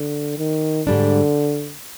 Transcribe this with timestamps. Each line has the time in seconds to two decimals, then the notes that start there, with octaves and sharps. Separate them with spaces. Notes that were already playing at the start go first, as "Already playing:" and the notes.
Already playing: D3
0.38 D#3
0.87 G#2 D3 G3 D4